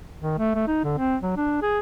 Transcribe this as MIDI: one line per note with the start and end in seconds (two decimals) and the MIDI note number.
0.22 0.38 51
0.38 0.54 57
0.55 0.66 57
0.68 0.80 63
0.84 0.93 50
0.98 1.16 60
1.23 1.33 54
1.37 1.60 62
1.62 1.80 68